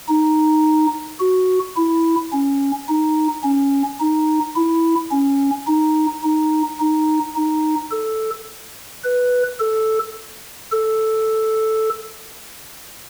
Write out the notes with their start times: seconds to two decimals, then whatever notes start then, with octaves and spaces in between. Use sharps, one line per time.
0.08 D#4
1.20 F#4
1.76 E4
2.32 C#4
2.88 D#4
3.44 C#4
4.00 D#4
4.56 E4
5.11 C#4
5.67 D#4
6.23 D#4
6.80 D#4
7.36 D#4
7.91 A4
9.04 B4
9.60 A4
10.72 A4